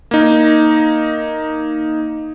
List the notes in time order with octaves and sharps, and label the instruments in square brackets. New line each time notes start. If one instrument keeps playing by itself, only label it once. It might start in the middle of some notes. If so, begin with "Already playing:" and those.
[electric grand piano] A#3 D#4